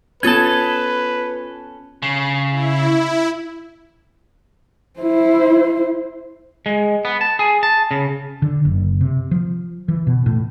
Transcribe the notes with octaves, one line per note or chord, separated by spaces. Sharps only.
B3 C#4 F4 A4 B4 G#6
C#3
E4
E4 C5
G#3
B3
A5
G#4
A5
C#3
D3
F#1
C3
F3
E3
B2
A2